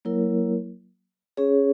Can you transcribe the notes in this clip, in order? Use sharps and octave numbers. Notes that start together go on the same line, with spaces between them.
F#3 A#3 E4 A#4 C#5
C#4 G#4 C#5